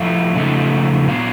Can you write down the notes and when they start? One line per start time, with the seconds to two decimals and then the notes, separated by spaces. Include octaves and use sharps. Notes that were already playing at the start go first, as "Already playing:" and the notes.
Already playing: A2 F3 A3 F5
0.35 C#3 F3 A3 C4 D#4
1.08 A#2 F#3 B3 D4 F5